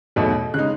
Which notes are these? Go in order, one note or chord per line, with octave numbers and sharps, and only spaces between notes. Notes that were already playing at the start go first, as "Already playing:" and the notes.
E2 B2 F#3 A3 D#4
C#3 G#3 D#4 F#6